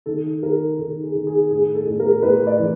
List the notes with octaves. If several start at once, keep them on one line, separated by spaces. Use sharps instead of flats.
D#3 A4
D#3 A#4
D#3 A4
G#4
D#3
G#4
A2 G#4
A4
A2
A#4
A2 B4
D5
E3